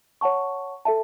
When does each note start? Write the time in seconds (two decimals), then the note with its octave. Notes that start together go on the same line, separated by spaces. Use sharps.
0.21 C#5 F#5 A5 C#6
0.85 A4 E5 A5